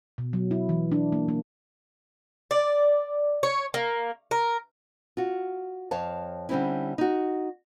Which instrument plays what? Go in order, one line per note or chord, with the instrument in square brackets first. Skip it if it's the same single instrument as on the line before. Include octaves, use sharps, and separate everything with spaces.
[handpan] B2
F#3
E4
E3
D4
A#3
A#3
[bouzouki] D5
C#5
A#3
A#4
[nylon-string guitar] F4 F#4
F2 C#5 F5 A5
D3 G3 C4 C#4 E4
D#4 F#4